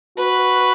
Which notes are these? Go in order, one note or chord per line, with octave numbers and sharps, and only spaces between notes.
F#4 B4